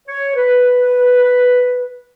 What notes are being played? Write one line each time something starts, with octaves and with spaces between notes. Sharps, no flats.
C#5
B4